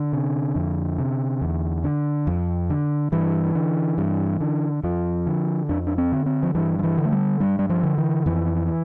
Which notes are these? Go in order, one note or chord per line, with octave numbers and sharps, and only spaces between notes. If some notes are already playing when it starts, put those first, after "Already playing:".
Already playing: D3
C3
F2
C3
E2
D3
F2
D3
G2 E3
D3
G2
D3
F2 F3
D3
F2 D4
D4
C4
D3
C4
F3
G2 E3
F3
E3
D3
A3
G3
G2 G3
G3
F3
D3
E3
F2 E3